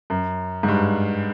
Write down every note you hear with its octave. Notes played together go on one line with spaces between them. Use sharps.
F#2
G#2
G2